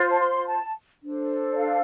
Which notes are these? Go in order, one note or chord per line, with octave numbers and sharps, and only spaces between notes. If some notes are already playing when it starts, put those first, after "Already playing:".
Already playing: F4 C5
A5
C6
A5
D4 A4 C5
D5
F5